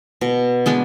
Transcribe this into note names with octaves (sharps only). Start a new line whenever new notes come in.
B2
G#3 B3 D4